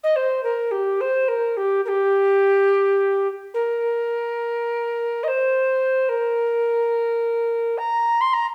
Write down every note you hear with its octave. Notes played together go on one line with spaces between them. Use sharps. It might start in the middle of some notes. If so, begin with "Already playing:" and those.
D#5
C5
A#4
G4
C5
A#4
G4
A#4
G4
A#4
D#5
C5
A#4
A#5
C6
A#5